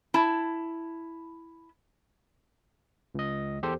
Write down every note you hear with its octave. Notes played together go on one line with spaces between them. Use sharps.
E4 A5
C#2 D#5
E2 G4 A4 C5